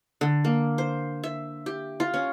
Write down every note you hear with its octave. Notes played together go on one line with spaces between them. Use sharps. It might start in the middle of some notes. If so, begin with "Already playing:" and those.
D3
A#3
C5
E5
G4
F4
C#4